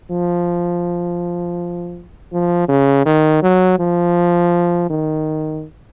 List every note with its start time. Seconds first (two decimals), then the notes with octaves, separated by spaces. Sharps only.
0.11 F3
2.32 F3
2.68 C#3
3.06 D#3
3.42 F#3
3.79 F3
4.90 D#3